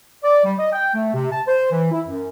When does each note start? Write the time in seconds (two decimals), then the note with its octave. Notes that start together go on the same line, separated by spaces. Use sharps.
0.24 D5
0.45 G3
0.59 D#5
0.73 G5
0.94 A3
1.14 C3
1.32 A5
1.48 C5
1.72 E3
1.92 E4
2.08 F#2